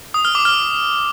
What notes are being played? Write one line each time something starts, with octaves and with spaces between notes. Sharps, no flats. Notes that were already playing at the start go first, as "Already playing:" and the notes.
D#6
F6
D6
F6